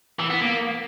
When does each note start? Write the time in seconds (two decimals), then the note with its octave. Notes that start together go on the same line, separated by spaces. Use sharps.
0.19 E3
0.30 B3
0.41 A#3